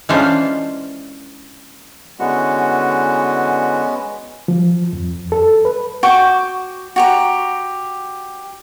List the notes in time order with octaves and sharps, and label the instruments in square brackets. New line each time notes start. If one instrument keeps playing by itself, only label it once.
[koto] E3 G#3 C#4 D4 F4 C5
[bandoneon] D3 E3 F#4 [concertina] G#3 B3 C#4
[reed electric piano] F3
F2
A4
B4
[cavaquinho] F#4 G5 C#6 D6
F#4 G4 A#5